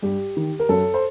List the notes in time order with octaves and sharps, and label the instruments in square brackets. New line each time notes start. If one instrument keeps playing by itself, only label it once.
[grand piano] G2 G4
D#3
A#4
F#2 A4
C5